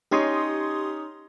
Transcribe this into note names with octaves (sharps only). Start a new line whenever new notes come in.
C#4 D#4 G4 C#5 C6 D#6